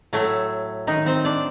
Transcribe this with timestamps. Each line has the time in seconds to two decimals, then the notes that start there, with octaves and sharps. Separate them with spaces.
0.13 A2 F#3 A3
0.87 D#3 D#4
1.06 C4 C5
1.25 D4 D5